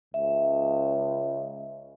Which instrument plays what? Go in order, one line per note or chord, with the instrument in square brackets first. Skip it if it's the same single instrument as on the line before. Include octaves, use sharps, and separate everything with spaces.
[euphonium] C#2 [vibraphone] E5